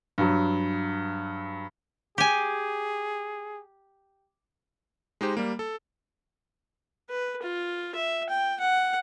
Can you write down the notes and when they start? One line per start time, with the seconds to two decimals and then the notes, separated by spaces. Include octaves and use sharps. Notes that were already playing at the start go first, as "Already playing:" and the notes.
0.18 G2 F#3
2.18 G4 G#4 G#5
5.21 G#3 D#4 G4 C5
5.37 G3 A#3
5.59 A4
7.10 B4
7.43 F4
7.96 E5
8.30 G5
8.60 F#5